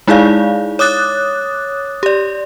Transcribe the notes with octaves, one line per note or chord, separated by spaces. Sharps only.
G#3 D#4 E4 G#4 D5 F5
C#5 D6 D#6 F#6 A6
G4 D5